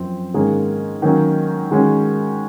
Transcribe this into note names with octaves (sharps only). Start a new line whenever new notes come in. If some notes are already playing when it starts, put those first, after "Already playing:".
Already playing: F#2 F3 C4
G#2 D#3 A#3 C#4 G#4
D#3 F#3 A#3 C#4
D#3 G#3 C#4 F#4